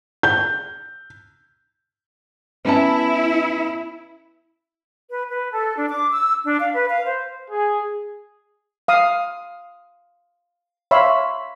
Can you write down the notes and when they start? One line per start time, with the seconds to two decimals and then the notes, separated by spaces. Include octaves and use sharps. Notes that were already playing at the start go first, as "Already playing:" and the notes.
0.23 G6
2.65 B3 C#4 E4 A5
5.10 B4
5.29 B4
5.50 A4
5.76 D4
5.89 D6
6.11 E6
6.45 D4
6.60 F5
6.73 B4
6.89 F5
7.06 C5
7.50 G#4
8.88 F5 D#6
10.91 C#5 E5 F5 B5 C6